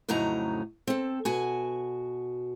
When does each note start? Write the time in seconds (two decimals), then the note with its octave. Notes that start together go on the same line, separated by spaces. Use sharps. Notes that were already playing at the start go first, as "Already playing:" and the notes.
0.09 F2 A2 C#3 F#3 D#4 A#5
0.87 C4 A4
1.25 B2 F#4 G#5